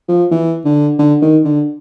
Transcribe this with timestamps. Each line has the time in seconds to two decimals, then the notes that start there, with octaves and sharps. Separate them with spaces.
0.09 F3
0.31 E3
0.65 D3
0.99 D3
1.22 D#3
1.45 D3